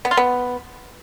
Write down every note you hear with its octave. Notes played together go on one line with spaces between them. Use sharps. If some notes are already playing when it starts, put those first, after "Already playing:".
B3
F4
B3